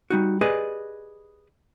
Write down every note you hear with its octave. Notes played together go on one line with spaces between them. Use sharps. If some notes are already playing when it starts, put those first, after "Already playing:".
G3 D#4 F#4
G4 G#4 B4 D5 D#5